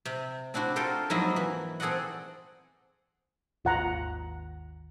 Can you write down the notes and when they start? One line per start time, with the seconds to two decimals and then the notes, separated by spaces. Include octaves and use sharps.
0.05 C3
0.54 C4 D4 E4 F#4
0.76 F4 A4 A#4 C5 G5
1.10 F2 G#2 F#3 A#3 E4 D#5
1.36 E3
1.80 C4 G#4 A4 D5 D#5 F#5
3.65 G#1 D#2 F4 F#5 A#5